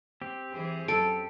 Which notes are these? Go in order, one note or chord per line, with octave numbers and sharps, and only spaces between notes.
C4 G4
E3 G#4 C5
F#2 A4 D7